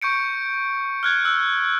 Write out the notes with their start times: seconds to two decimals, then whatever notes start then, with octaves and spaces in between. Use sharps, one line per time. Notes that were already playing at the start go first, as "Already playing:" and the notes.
0.02 C#6 G6 C#7 D7
1.03 F6 F#6 G#6
1.25 E6 F#6